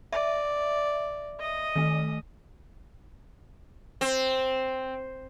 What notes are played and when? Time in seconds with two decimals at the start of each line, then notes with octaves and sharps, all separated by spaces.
0.12 D5 E5
1.39 D#5 D#6
1.76 D#3 A3
4.01 C4